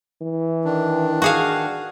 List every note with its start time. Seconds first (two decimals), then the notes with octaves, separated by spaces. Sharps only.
0.22 E3
0.65 D#3 D4
1.22 F#4 G#4 F5